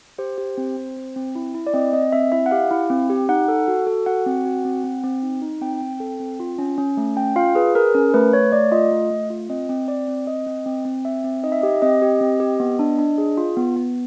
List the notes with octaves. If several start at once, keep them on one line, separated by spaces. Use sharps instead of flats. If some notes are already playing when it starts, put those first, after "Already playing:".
G4 C5
G4
C4
C4
C4
C4
E4
E4
D5
C4 D#5
C4 D#5
C4 E5
E4 E5
F#5
G4 F5
E4
C4
G4
D#4 F#5
A4
F#4
A4
F#4 F#5
C4
F#4
C4
C4
C4
D#4
D#4
C4 G5
C4
A4
C4
F4
C#4
C#4
A3
C#4 G5
F4 F5
G#4 B4
G#4 A#4
C#4 A#4
A3 B4
A3 C#5
A3 D5
F4 D#5
A3
A3
F4
C4 D#5
C4
C4 D5
C4
C4 D#5
C4
C4
C4
C4 E5
C4
D#4 D#5
E5
G4 D#5
C4 D#5
G4
C4
G4
B3
D4
D4
G#4
F4
B3
B3